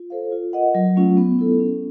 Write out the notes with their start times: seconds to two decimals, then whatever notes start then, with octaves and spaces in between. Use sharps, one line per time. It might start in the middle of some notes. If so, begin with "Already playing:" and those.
Already playing: F4
0.10 A4 C5 F5
0.32 F4
0.53 A#4 D#5 F#5
0.75 F#3
0.96 A3 C#4 F4
1.17 B3
1.39 E4 A4
1.59 C#4